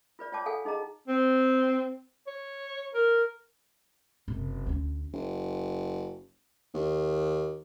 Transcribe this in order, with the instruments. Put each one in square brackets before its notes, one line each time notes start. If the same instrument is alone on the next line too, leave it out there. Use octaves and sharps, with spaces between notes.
[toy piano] F4 B4 D5
F4 C#5 D5 G5 A5 D6
A4 F5 F#5 G#5
D#4 G#4 D#5 A#5
[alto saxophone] C4
C#5
A#4
[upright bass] F#1 C3
D2 C#4
[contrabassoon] F#1
D#2